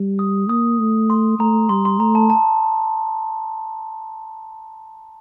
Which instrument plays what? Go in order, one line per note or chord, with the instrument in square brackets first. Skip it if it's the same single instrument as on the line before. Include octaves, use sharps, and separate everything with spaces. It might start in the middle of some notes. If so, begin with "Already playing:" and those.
Already playing: [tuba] G3
[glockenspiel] D#6
[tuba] A#3 [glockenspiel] D#6
[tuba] A3
[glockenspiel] C6
[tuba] A3 [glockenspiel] A#5
[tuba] G3 [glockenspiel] C6
[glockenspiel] C6
[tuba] A3 [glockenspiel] A#5
[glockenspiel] A5
A5